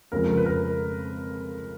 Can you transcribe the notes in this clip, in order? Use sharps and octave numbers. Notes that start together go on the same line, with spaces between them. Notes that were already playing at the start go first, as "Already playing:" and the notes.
F2 C#3 F3 G#3 A#4
A#4
B4
A#4